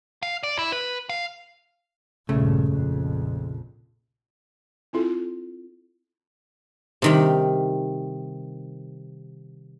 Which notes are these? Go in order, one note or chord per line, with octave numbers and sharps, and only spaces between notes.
F5
D5
E4
B4
F5
A#1 G2 C#3 A3
A#1 F2
C4 E4 F4 A4
C3 D#3 G3